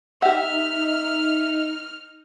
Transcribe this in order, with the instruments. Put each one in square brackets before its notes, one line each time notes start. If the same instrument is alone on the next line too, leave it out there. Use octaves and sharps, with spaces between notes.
[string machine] D#4 [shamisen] G4 F#5 [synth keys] E5 [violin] F6